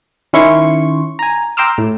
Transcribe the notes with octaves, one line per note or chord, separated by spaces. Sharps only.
D#3 C#4 E4 C6 C#6
G#5 A#5
G5 A#5 C6 D6 E6 F6
A2